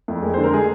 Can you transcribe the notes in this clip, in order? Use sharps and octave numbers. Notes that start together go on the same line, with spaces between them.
F2
G#3 A#4
D3 C5
A#4
G#3 G#4